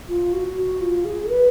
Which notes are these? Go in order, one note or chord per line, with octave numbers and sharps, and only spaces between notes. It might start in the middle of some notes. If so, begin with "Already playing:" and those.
F4
F#4
F#4
F4
G#4
B4